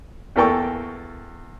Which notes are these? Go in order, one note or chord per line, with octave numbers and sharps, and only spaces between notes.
E2 A#3 A4 G5 C#6